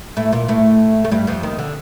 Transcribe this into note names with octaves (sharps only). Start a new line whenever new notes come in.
A2 A3
A#2 A#3
A2 A3
A3
G2 G3
F2 F3
D#2 D#3
D3